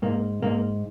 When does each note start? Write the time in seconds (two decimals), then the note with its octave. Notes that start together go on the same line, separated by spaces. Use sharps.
0.02 G#2 A#3
0.42 G#2 A#3